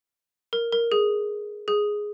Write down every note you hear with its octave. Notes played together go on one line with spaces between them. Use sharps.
A#4
A#4
G#4
G#4